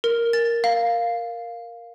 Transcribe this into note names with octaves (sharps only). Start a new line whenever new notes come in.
A#4
A6
F5